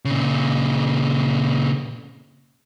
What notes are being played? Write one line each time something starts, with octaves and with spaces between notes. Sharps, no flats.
A#2 C#3